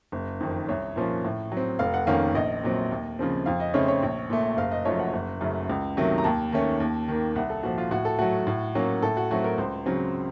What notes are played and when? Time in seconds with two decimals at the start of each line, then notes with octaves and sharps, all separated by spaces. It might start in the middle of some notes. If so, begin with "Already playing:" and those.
0.12 F#1
0.40 F2 D#3
0.69 C2 C#5
0.96 A#2 F3 A#3 C#4
1.25 A2
1.52 F#3
1.57 C4
1.79 F1 F5
1.94 F#5
2.07 F2 D#3 A#3 C#4 F5
2.35 A#1 D#5
2.63 A#2 F#3 C4
2.91 D#2
3.19 C#3 F3 C4
3.46 F2 F5
3.60 D#5
3.74 C#3 A3 C4 C#5
3.88 C#5
4.02 A#1
4.30 A#2 A3
4.57 F#1 F5
4.72 D#5
4.85 F#2 F3 A3 C#5
4.99 F#5
5.13 F#1
5.41 F#2 C#3 A3
5.69 C#2
5.97 C3 D#3 F#3 A3
6.18 A#5
6.24 D#2 A5
6.53 D#3 A3 C#4
6.80 D#2
7.08 D#3 A#3
7.35 C2 F#5
7.50 A4
7.63 A#2 F3 F#4
7.78 F4
7.91 A2 F#4
8.05 A4
8.19 F#3 A3 F#4
8.47 A2
8.75 F#3 A#3 C#4
9.02 A2 A4
9.17 F#4
9.31 F#3 A3 C4 F#4
9.44 A#4
9.58 C#2 C5
9.86 C#3 F#3 C4